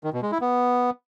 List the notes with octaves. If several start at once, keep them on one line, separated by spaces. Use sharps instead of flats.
D#3
B2
G#3
E4
B3